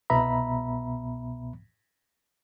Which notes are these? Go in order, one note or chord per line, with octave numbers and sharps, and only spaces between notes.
C2 B2 B3 E5 A#5 B5